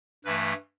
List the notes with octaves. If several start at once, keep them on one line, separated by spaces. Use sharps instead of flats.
G2 E3 A3 B4